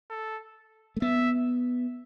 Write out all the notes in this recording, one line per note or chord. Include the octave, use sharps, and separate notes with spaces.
A4
A3
B3 E5